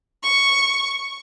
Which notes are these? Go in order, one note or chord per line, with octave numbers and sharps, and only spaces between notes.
C#6